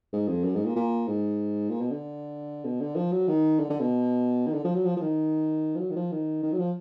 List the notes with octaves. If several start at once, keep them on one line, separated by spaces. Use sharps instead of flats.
G#2
F2
F#2
G#2
A#2
A#2
G#2
A#2
B2
D3
B2
D3
F3
F#3
D#3
D3
D3
B2
D#3
D3
F3
F#3
F3
F3
D#3
F3
F#3
D#3
F3
D#3
D#3
F#3
F3